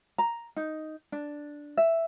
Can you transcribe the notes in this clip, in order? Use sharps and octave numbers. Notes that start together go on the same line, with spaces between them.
A#5
D#4
D4
E5